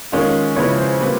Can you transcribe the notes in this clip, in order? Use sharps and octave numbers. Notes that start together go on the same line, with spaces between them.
D#3 G#3 C#4 F4
C#3 F3 G#3 C#4 E4 B4 C#5
C5
A#2 G3 C4 B4